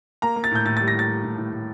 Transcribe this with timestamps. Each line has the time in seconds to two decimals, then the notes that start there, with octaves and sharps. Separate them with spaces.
0.22 A#3 A#5
0.36 A#3
0.44 A6
0.51 A2 G6
0.65 A2 A6
0.77 G3 A6
0.88 A#6
0.94 A2 A6
1.09 G3
1.24 A2
1.38 A2
1.53 A2